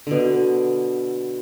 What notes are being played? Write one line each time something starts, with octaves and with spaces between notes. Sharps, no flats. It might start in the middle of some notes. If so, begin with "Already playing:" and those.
B2 D3